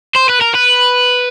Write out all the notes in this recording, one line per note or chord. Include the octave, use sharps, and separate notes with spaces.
C5
B4
A#4
B4